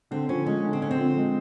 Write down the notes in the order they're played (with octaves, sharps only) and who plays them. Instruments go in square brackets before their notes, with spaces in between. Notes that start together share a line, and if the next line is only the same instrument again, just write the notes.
[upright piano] D3 [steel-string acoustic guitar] C4
[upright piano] F3 [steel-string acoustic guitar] C#4
[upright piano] G#3 [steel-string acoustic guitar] C#4
[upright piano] D3
[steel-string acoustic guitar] C4
[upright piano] D3 [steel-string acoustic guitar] C#4
[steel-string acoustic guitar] C4
[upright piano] F3
G#3